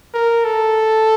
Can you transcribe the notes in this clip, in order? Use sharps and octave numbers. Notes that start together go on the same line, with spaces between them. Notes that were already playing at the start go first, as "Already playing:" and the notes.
A#4
A4